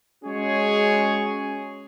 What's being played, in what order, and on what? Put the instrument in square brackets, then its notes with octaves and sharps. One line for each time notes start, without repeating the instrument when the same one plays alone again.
[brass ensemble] G#3 C#4 F#4 G#4 C#5